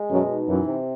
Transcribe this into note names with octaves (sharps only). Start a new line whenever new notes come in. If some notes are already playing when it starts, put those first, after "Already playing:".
Already playing: G#3
F#2 B2
D#4
F#2 E3
C3